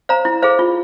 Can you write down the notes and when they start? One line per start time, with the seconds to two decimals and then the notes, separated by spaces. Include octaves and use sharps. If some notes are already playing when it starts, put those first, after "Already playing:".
0.09 C5 F5 A#5
0.25 E4
0.42 G#4 C5 F5
0.59 F4